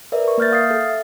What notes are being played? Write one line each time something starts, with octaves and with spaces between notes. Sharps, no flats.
A#4 B4 D5 E5
A#4 C#6
A#3 E5 F6 G6 A6
E5 F5 D#6 F6 A6 C7
A4
E5